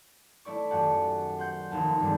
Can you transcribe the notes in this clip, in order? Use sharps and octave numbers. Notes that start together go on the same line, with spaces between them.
A3 E4 D5 C#6
D#1 F#2 G4 F#5 A5
C5 F#5 G6
F1 D#2 A5
G2 D3 D#3 G3 G#3 C4